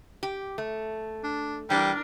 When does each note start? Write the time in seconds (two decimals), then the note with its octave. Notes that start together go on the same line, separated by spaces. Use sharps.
0.23 G4
0.58 A3
1.24 D4
1.70 E3 G3 D4 A#4